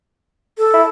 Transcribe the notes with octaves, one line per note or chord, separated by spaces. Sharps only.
A4
E4